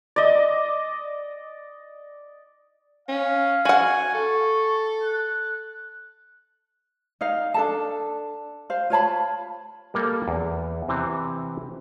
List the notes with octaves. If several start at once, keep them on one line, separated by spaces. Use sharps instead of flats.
D5 D#5
C#4 F5
F#4 F#5 G#5
A4 C#6
F#6
D#4 F5
D4 A4 A5
C5 F5
F4 C#5 A5 B5
G3 A#3 A4
E2
C3 E3 C4